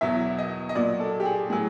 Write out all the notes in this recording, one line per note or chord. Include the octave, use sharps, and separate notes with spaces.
E2 B2 F#3 E5
D#5
D#5
A#2 F#3 D5
A4
G4
G#4
A2 F#3 G#4